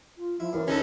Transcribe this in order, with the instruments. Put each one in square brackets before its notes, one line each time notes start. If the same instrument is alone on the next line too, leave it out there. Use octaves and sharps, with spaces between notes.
[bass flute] F4
[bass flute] F3 [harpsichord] E4
[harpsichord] F#2 [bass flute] E3 [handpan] E4 A#4 C5
[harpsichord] D2 [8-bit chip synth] C#4 D#4 A4 [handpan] F#4 G#4 C#5 [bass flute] B4